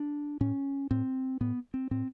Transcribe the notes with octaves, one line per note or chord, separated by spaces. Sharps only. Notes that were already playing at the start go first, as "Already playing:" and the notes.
Already playing: D4
A2 C#4
A2 C4
A2 B3
C4
A2 C4